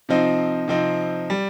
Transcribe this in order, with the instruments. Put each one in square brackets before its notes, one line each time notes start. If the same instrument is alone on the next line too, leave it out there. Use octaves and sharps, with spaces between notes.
[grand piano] C3 F3 C4 D#4
C3 F3 C4 D#4
G3